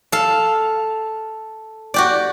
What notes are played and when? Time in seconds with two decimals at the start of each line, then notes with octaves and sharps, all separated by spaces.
0.12 A4 F5
1.94 F#4 G4 D5